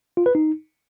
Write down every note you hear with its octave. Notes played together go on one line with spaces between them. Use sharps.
F4
B4
D#4